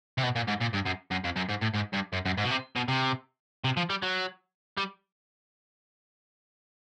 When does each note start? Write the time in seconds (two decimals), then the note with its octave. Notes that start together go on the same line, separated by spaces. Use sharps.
0.18 C3
0.23 B2
0.36 A#2
0.48 G#2
0.61 A#2
0.74 G2
0.86 F#2
1.11 F#2
1.24 F2
1.36 F#2
1.49 G#2
1.62 A2
1.75 G#2
1.94 G2
2.13 F#2
2.25 F#2
2.38 G#2
2.44 B2
2.50 C3
2.76 B2
2.88 C3
3.64 C3
3.77 F3
3.90 G3
4.02 F#3
4.78 G3